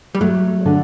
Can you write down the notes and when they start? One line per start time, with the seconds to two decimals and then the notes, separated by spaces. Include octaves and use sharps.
0.15 G3
0.21 F#3 A3
0.66 D3